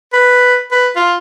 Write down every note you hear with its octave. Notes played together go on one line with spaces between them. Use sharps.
B4
B4
F4